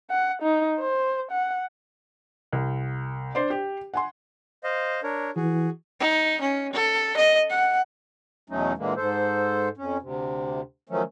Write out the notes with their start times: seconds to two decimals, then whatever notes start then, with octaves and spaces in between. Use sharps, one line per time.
0.10 F#5
0.43 D#4
0.79 C5
1.31 F#5
2.52 C2
3.35 D4 C5 D5
3.50 G4
3.94 F#5 G#5 C6
4.64 C5 D#5 F5
5.03 D4 A#4 C#5
5.36 E3 F#4 G#4
6.00 D#4
6.41 C#4
6.73 A4
7.17 D#5
7.50 F#5
8.50 E2 B2 F#3 A3 C#4 D#4
8.77 A#2 D3 E3 G#3 A#3
8.96 G#2 A4 C5
9.77 F2 C#4
10.01 D2 C3
10.89 D#3 F3 F#3 A3 C#4